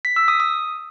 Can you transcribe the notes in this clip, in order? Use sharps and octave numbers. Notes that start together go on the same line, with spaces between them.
B6
E6
D#6
D#6